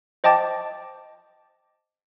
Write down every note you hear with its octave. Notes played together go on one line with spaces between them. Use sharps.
C5 D#5 G5 A5 D6 A6